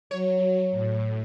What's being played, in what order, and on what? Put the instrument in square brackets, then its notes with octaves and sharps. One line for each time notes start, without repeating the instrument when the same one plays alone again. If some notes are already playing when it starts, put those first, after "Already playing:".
[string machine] F#3 [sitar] C#5
[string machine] A2